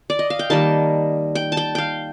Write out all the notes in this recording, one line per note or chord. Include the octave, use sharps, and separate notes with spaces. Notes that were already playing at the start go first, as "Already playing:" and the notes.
D5
D#5
F5
G5
D#3 G3 A#3 A5
G5
A5
G5
F5 G5